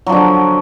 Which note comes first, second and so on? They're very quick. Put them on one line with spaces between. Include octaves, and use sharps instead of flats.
F#3 F3 D3